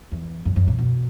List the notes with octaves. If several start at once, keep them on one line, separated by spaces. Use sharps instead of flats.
E2
F#2
F#2
A#2
B2